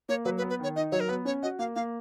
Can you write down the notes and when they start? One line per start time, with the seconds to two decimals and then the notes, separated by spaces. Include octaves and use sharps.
0.09 A#3 C#5
0.25 F#3 B4
0.38 B4
0.42 B3
0.50 B4
0.59 D#3 C#5
0.76 D#4 D#5
0.92 F#3 C#5
1.00 A#4
1.08 B3 B4
1.25 C#4 C#5
1.42 F#4 D#5
1.59 A#3 F5
1.75 A#3 F5